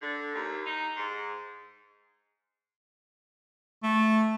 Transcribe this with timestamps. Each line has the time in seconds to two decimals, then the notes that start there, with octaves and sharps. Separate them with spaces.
0.01 D3
0.34 D#2
0.66 D#4
0.97 G#2
3.83 A3